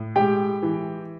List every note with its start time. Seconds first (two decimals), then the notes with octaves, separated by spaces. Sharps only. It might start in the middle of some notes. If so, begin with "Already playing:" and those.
Already playing: A2
0.16 G#3 G4 G5
0.63 E3